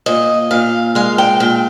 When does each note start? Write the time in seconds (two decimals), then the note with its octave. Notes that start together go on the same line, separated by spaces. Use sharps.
0.06 A#2 D#5
0.51 A#2 F5
0.95 G#3 F5
1.18 G5
1.40 A#2 G5